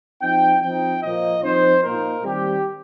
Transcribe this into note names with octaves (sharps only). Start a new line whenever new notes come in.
F3 C4 D#4 G5
F3 C4 D#4 G5
A#2 F3 A#3 D#5
F3 C4 D#4 C5
A#2 A#3 D#4 A#4
D#3 G3 C4 G4